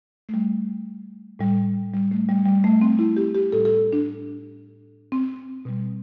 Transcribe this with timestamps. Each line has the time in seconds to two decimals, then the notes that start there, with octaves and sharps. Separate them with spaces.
0.29 A3
0.34 G3
1.39 A2 G3
1.94 G3
2.11 A3
2.29 G3
2.46 G3
2.64 A3
2.81 C4
2.99 E4
3.16 G4
3.35 G4
3.53 A2 G3 A4
3.65 A4
3.93 D4
5.12 C4
5.65 B2 G3